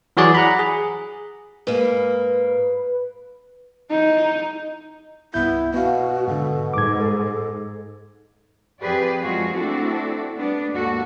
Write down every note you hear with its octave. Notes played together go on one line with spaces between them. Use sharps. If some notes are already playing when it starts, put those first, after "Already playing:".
E3 F#3 F#4 G#4 D5
F#5 A#5 B5
G#4
G#2 A#3 B4
D#4
C2 G2 B3 E4 G6
B2 B3 F#4 F5
G#2 D3 A4
G#2 D6 G#6
F2 G4 G#4 B4 D5
F#2 F3 G#3 F4 F#4 G#4
A3 C4 D4 E4 F#4 A4
G3 B3 D4
D#2 G#2 F#4 A4